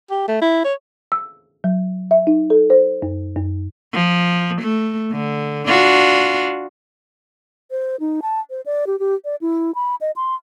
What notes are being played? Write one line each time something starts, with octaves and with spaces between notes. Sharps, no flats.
G4
A3
E4
C#5
E6
F#3
E5
D#4
A4
C5
F#2
F#2
F3
A3
D3
D4 F4 F#4
C5
D#4
A5
C5
D5
G4
G4
D5
E4
B5
D#5
C6